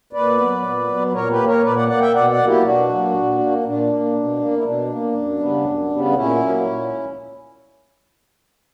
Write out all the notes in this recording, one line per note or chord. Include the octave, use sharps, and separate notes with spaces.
A#2 B4 D5
F#3 B3
A#2
F#3 B3
A#2 A#4 C#5
G4 B4
A#3
A#4 C#5
A#2 B4 D5
D5 F#5
A#3 D5 F#5
E5 G5
B2 D5 F#5
D5 F#5
F#3 A#3
E4 G4
B2 D4 F#4
F#3 A#3
A#2
A#3
A#2 D4
A#3
B2
A#3
E4
B2 D4
A#3
F#2
C#3 G3 B3
F#2
C#3 G3 B3
D4
A#2 C#4 E4
F#3 A#3
A#2